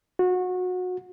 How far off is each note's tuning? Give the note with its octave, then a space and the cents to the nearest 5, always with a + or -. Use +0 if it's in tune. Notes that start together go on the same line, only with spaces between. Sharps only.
F#4 -25